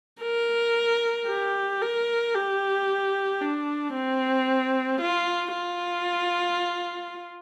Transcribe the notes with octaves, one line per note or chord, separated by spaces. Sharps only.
A#4
G4
A#4
G4
D4
C4
F4
F4